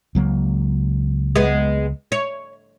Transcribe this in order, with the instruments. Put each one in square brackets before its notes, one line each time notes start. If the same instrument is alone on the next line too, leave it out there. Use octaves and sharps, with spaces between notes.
[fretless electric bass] C#2 F#3 A#3
[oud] G#3 B3
C#5